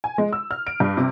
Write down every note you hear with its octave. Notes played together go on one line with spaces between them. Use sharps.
G#5
G#3
E6
F6
D7
G2
C3